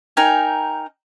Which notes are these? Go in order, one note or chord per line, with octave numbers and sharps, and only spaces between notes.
D#4 A#4 G5 G#5